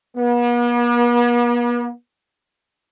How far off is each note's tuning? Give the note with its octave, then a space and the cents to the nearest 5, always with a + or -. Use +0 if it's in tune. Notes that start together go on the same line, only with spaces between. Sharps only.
B3 -45